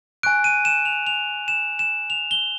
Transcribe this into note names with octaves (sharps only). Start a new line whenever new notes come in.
G#5 C#6 F#6 D7
D#7
E7
F7
F7
E7
E7
F7
G7